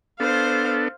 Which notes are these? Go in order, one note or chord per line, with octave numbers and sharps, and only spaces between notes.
B3 D4 A4 C5 F5